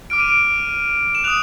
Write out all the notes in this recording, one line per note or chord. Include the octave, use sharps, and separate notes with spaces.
D6 F6 D7
D#7
D7
E7
D#6 F#6 F7